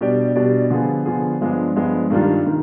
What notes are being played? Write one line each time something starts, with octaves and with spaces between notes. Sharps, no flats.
B2 G3 D4 G4 D5
B2 G3 D4 G4 D5
D3 F3 B3 F4 G#4
D3 F3 B3 F4 G#4
G2 F3 G#3 B3 D4
G2 F3 G#3 B3 D4
G2 D#3 G3 D4 F4
D#3